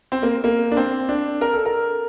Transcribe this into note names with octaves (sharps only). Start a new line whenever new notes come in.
C4
A#3
A#3
D4
C4
D4
A#4
A4
A#4